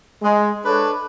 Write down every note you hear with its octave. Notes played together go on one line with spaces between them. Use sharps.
G#3
D4 A4 B4 C#5